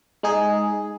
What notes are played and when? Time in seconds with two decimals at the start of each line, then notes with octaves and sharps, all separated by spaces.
0.23 G#3 D#4 G#4